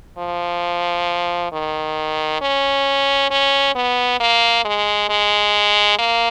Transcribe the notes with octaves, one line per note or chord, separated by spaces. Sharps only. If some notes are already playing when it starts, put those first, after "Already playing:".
F3
D#3
C#4
C#4
B3
A#3
G#3
G#3
A#3